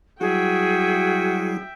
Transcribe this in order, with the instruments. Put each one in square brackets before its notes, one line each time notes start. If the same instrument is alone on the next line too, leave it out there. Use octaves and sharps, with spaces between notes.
[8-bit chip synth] F#3 G3 E4 [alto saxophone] F#4 [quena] G#4 [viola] E5 G5